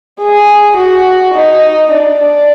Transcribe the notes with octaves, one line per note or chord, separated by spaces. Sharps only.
G#4
F#4
D#4
D4
D4